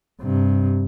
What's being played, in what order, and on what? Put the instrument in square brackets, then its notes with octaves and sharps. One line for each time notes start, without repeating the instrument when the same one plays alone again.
[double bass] G2 C3